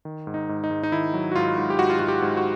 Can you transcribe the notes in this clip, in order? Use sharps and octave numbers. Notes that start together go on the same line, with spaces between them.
D#3
G#2
D#4
G#2
D#4
G#2
D#4
D#3 E4
F#3
F#4
G#2 F4
G#2
G4
G#2 F#4
F4
G#2 F#4
G4
G#2
F#4